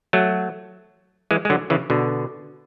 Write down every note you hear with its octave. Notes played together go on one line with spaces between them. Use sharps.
F#3 A3
E3 G#3
G#3
D3 F#3
C#3 E3
B2 D3